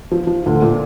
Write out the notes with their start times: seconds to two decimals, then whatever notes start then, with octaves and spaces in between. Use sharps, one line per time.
0.11 F3
0.27 F3
0.46 D2
0.62 A#2